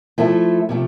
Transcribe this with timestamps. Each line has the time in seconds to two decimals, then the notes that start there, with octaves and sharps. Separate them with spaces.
0.18 F3 A3 E4 A4
0.69 C3 F3 A3